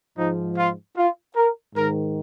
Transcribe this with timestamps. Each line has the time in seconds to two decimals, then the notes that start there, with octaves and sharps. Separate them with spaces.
0.18 G#2 F3 D#4
0.58 F4
0.97 F4
1.36 A#4
1.76 G#2 D#3 A#4